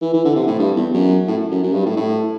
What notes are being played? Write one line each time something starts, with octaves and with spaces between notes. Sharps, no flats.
E3
E3
D3
C3
A2
G2
E2
F#2
A2
F#2
F#2
G2
A2
A2